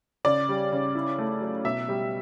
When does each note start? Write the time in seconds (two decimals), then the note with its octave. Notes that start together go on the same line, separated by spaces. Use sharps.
0.25 C#3 D5
0.49 G3
0.72 C#3
0.95 E4
1.18 A3
1.41 F#3
1.64 B2 E5
1.89 G3